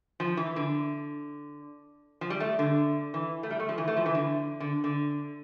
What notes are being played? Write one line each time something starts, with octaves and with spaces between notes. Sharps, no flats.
F3
E3
D3
F3
G3
A3
D3
E3
A3
G3
A3
F3
E3
A3
F3
E3
D3
D3
D3